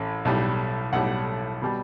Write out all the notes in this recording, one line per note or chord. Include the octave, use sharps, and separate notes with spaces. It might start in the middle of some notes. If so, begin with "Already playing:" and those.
Already playing: A1 A2 C#4
B1 A2 G3
B1 A2 G3 F#5
B2 G3